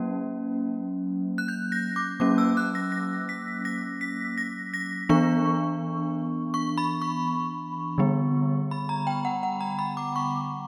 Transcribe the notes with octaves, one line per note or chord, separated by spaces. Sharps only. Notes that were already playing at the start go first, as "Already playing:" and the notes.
Already playing: F#3 A#3 C#4
F#6
G6
A#6
D6
F#3 A#3 C#4 D6
E6
F#6
A#6
A#6
B6
A#6
B6
A#6
A#6
E3 B3 D4 C#6
C#6
B5
C#6
D3 G3 B3
B5
A#5
G5
F#5
F#5
A#5
B5
D6
C#6